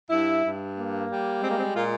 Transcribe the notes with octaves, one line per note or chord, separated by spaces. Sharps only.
G2 E4
G2
A#3
G3
G#3 C4
A#3
C4
A#2 F4